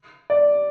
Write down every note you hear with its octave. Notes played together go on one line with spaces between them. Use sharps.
D5